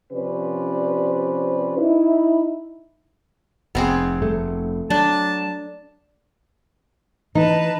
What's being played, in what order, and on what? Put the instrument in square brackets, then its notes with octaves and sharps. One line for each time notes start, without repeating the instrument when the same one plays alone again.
[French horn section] C3 F3 C#4 B4 C5 D5
D#4 E4
[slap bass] F1 C3 [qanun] B3 C4 G#4
[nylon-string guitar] A3
[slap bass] F#3 [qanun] D4 [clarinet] A5
[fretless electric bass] E3 [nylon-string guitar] D#4 [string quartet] B4 A5 A#5